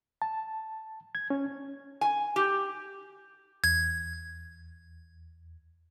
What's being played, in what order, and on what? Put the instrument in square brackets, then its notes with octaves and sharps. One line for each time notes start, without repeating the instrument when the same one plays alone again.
[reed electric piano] A5
G#6
C#4
[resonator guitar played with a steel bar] G#5
G4
[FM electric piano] E2 [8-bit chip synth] G#6